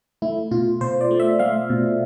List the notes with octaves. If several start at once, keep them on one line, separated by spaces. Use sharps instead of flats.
A3 E4
B2 F4
B2 C5
D5
A3
E5
A3 F5
B2